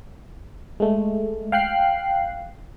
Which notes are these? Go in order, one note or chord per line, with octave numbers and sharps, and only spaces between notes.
G#3 A3
F5 G5 F#6 C7